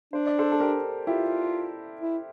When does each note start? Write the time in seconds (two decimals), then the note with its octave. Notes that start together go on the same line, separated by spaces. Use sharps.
0.13 D4 C5
0.27 D5
0.39 A4 C5
0.52 A4
0.60 G4 A#4
1.07 E4 F4 G4
2.01 E4